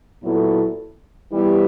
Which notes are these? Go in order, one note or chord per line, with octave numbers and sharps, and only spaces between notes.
A#2 F#3 B3 E4 A4
E3 G3 B3 E4 G4